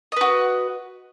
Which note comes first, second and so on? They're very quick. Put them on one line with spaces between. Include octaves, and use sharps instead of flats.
D#5 B4 F#4